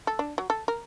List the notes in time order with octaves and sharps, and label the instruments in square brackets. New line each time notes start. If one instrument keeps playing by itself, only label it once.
[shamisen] A4
D4
F#3
A4
A#4